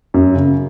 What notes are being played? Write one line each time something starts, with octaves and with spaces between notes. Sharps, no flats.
F#2
C#3